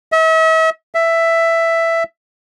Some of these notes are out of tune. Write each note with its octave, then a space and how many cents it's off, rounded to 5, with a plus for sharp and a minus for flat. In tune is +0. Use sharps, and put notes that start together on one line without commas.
E5 -40
E5 +10